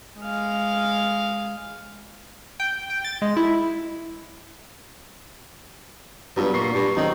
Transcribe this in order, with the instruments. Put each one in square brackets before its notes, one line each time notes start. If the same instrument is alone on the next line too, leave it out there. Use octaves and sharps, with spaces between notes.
[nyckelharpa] G#3 F5
[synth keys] G5
G5
A6
G#3
E4
[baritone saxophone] G2 [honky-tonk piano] F#3 B3 F4
[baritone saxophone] A#2 [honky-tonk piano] C#6 C7
[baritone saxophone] G2
[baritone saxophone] D#3 [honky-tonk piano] F#3 C4 D#4